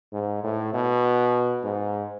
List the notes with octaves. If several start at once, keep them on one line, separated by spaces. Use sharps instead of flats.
G#2
A2
B2
G#2